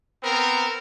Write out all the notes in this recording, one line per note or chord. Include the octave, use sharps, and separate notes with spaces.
B3 C4 A#4